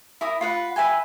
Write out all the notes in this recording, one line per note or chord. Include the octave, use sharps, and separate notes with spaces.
E4 A#4 D#6
F4 B4 F#5
B4 E5 G5 G#5